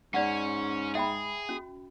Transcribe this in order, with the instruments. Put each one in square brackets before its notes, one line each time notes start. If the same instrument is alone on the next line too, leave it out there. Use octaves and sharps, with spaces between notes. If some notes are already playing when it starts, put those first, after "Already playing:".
[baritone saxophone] G#2 [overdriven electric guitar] C#4 [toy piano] D5 F#5
[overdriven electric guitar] G#4 [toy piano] E5 G5 B5
[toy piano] C#4 F#4